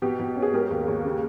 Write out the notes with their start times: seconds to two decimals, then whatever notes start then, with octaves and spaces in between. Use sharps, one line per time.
0.02 B2 G4
0.19 B2
0.36 C#4
0.42 G#4
0.53 G#3 G4 A#4
0.71 D#2
0.88 D#2
1.05 C#3